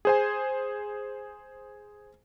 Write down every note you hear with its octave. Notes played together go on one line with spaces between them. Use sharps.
G#4 C5 G#5